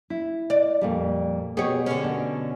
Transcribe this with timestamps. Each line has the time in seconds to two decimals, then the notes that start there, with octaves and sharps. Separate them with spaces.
0.10 E4
0.50 D5
0.81 F2 A#2 G3
1.57 B2 G4 G#4 C#5
1.86 D3 C#4
2.03 B2 D4